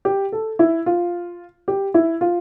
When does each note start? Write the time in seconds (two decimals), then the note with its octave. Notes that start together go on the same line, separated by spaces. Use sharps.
0.05 G4
0.32 A4
0.59 E4
0.86 F4
1.68 G4
1.94 E4
2.21 F4